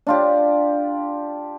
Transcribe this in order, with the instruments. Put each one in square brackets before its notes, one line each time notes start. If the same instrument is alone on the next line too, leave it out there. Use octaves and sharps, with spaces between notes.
[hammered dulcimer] D4 F4 G4